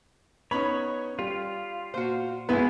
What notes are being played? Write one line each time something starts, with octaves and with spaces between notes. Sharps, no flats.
B3 C#4 D#4 C#5 B5
G3 F4
A#2 F#4 C5
B1 G#3 B3 E4 B4